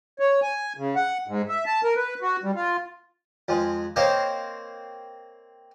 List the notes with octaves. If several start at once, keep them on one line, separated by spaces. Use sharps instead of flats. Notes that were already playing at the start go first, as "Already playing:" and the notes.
C#5
G#5
C#3
F#5
G#2
E5
A5
A#4
B4
F#4
G3
F4
F2 G#3
A#3 C4 C5 C#5 D#5 F5